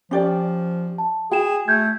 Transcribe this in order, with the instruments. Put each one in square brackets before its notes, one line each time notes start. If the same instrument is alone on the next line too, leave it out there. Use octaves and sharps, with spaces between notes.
[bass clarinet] F3 [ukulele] C#4 G4 D5
[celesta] A5
[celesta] F#4 E7 [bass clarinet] G#4 [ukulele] G5
[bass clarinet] A3 [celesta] G6 G#6